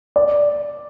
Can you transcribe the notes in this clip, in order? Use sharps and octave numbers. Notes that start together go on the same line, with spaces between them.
D5